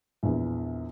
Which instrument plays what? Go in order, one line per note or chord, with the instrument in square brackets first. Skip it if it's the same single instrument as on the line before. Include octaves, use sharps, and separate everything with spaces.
[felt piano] A#1 E2